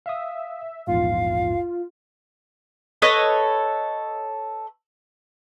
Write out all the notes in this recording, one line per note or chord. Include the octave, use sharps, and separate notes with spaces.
E5 F5 D#6
A#1 E2 G#2 F4 F5
A4 B4 C#5 D#5